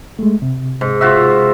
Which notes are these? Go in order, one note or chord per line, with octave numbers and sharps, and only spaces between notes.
G#3 A3
C3
G#2
F4 F#4 E5